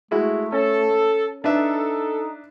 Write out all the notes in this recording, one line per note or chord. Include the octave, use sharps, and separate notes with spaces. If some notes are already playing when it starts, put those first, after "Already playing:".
G#3 A3 E4 F#4
C#4 A4
D4 D#4 A4 B4 E5